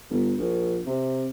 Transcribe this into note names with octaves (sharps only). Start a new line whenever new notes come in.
G1
A#1
C3